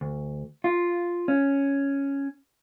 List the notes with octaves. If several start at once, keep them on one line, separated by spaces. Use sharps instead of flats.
D2
F4
C#4